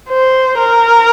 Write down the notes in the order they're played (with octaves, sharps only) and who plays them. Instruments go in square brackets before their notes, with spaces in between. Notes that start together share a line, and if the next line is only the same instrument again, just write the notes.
[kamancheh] C5
A#4